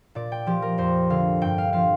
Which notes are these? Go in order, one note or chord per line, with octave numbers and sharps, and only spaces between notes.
A#2 D5
G5
F3 G4
A#4
F2 C5
D3 F5
G2 G5
F5
F3 F5